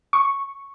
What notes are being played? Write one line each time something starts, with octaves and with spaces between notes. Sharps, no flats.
C#6